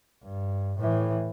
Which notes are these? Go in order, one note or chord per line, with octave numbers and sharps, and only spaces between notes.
G2
A2 E3